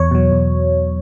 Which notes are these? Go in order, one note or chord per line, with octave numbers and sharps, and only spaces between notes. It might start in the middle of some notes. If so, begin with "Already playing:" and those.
Already playing: E2 C#5
B2 F#3
E2